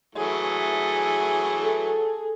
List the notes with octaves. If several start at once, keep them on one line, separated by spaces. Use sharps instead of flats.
E3 F#3 A3 G#4
A4